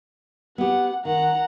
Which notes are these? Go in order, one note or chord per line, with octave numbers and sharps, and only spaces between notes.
B3 G4 F#5
D#3 F#5 A#5